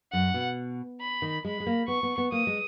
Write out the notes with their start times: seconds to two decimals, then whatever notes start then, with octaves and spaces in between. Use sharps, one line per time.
0.13 F#2 F#5
0.34 B2
1.01 B5
1.22 D#3
1.45 G#3 B5
1.60 G#3
1.67 A#3
1.88 B3 C#6
2.03 B3
2.18 B3
2.32 A#3 D#6
2.47 G#3